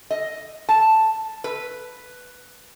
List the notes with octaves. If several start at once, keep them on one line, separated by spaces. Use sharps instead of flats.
D#5
A5
B4